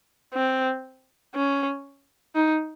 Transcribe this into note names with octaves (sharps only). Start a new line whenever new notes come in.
C4
C#4
D#4